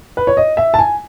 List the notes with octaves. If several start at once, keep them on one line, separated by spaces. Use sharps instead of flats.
B4
C#5
D#5
E5
A5
G#5